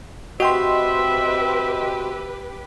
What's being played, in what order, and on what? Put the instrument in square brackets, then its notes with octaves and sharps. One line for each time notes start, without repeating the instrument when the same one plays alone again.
[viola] C4 E5 [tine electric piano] F#4 [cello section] G4 B4 [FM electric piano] D#5 G5 C6